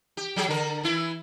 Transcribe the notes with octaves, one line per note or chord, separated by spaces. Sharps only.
G4
F#3 G4 G#4
D3 A#4
E3 E4